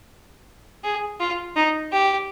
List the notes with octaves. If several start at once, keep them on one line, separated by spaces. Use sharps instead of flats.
G#4
F4
D#4
G4